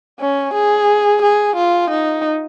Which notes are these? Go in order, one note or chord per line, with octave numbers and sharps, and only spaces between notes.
C#4
G#4
G#4
F4
D#4